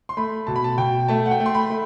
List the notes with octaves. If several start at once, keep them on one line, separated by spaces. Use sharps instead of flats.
C6
A3 B5
B2 A5
B5
A5
B2 G5
A3 A5
F#5
G5
A3
C6
B5
A3